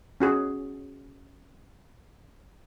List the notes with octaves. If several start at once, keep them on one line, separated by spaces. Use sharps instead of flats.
C#4 F#4 G#4